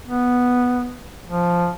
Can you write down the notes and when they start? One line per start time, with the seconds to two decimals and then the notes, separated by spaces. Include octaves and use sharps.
0.07 B3
1.27 F3